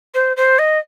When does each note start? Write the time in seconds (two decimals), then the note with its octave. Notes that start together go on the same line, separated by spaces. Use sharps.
0.14 C5
0.36 C5
0.58 D#5